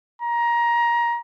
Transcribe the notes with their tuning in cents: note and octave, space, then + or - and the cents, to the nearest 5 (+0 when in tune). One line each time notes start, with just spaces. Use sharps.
A#5 +20